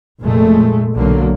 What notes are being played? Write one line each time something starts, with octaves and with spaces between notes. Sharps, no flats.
F1 A#2 G#3 A3
B1 D3 F#3 A#3